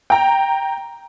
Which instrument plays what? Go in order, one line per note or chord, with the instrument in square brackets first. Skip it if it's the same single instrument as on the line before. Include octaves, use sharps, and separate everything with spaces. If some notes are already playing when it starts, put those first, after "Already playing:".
[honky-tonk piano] G5 A#5